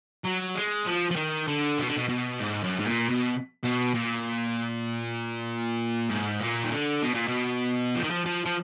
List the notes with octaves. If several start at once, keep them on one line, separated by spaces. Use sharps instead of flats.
F#3
G#3
F3
F3
D#3
D3
B2
D3
B2
B2
G#2
F#2
G#2
A#2
B2
B2
A#2
G#2
A#2
D#3
D3
B2
A#2
B2
F3
D#3
F3
F3
F3